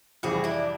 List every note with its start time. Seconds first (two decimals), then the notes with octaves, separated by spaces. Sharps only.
0.23 F2 C3 E3 G3 F#4 G#4
0.44 D4 E4